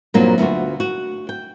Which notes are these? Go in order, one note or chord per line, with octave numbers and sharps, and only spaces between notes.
G2 A#2 F#3 A#3 C4 D#4
D2 B3 F4 F#4
F#4
G5